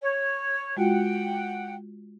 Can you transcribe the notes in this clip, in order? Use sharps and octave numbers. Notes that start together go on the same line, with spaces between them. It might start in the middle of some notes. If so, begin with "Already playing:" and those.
C#5
G#3 F4 F#4 F#5 G5